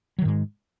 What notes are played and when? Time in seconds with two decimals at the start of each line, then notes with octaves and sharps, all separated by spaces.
0.18 F#3
0.22 D#3
0.25 G#2
0.28 G#3